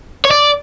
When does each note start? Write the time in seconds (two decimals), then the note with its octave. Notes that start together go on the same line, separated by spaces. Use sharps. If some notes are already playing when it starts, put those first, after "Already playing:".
0.25 C#5
0.31 D5